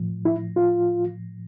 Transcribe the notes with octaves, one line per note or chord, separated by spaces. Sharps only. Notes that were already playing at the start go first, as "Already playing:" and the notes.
Already playing: A2 F3
E4
F4